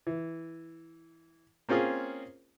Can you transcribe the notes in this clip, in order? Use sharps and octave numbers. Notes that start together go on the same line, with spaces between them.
E3
A#3 C4 C#4 F4 G#4